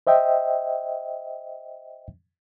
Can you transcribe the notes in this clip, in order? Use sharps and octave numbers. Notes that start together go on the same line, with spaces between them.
C5 D#5 E5 G5